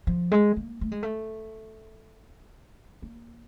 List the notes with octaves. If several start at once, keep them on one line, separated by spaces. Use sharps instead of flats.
F3
G#3
A#3
A3
G#3
A3
A#3